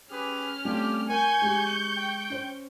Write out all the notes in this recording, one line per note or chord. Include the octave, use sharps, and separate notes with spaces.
C#4 G4 G#4 B4 F6
G3 A3 C4 F4 G4
A#4 G5 G#5 C#6 G6
G#3 G4
G5
C#4 C5